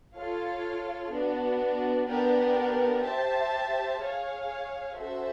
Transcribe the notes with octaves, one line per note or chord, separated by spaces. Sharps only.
F4 A4 C#5 F5
B3 D4 F#4
B3 D4 G4 A#4
G4 C5 E5 A5
G#4 C#5 F5
C#4 F#4 A4 C5 E5